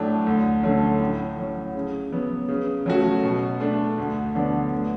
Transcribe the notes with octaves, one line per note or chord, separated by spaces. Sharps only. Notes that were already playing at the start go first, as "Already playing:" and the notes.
Already playing: A2 F#3 A3 D4
D2
D3 F#3 A3 C#4
A2
F#3 C#4
C#3
F#3 B3
C#3
F#3 A3 C#4 F#4
B2
A3 D4
D2
D3 F#3 B3 D4
D2